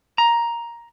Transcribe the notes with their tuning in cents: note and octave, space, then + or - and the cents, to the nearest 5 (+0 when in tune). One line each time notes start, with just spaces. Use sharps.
A#5 +10